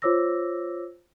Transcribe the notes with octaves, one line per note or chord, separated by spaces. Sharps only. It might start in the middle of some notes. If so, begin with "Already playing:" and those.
F4 C5 C#5 D6 E6 A#6